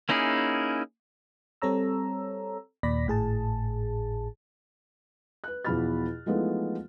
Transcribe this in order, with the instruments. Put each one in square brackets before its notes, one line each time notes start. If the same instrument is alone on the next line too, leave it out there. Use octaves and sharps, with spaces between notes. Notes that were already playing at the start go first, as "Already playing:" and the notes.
[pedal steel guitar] A#3 C#4 D#4 E4 G#4
[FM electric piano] G3 C4 A4 C#5 A#5 E6
D#2 A#2 D5 B5 A#6 B6
G#1 A2 G#4 A5
[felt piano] B4 F#6
E2 B2 F3 B5 F6 A6
E3 F3 G#3 A3 B3 D#4